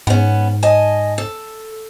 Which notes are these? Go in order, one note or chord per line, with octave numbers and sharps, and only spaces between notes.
G#2 B3 C#4
D#5 G#5 A5
A4